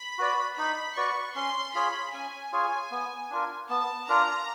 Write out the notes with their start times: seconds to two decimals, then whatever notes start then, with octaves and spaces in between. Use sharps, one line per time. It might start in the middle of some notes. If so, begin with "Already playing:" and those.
Already playing: B5
0.18 F#4 B4 D5
0.58 D#4 B5
0.96 F#4 B4 D5 C#6
1.35 C#4 C6
1.74 F4 G#4 C#5 B5
2.14 C#4 G#5
2.52 F4 G#4 C#5
2.91 B3
3.30 D4 F4 A#4
3.69 B3 A5
4.08 D4 F4 A#4 A#5